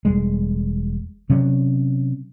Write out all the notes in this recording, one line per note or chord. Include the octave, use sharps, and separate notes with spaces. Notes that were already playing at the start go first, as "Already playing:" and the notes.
E1 G3 G#3
C3 F#3 C#4